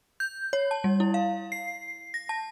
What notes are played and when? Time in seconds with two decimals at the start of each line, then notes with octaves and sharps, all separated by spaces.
0.20 G6
0.53 C#5
0.71 A5
0.84 G3
1.00 E4
1.14 F5
1.52 C7
2.14 A#6
2.29 A5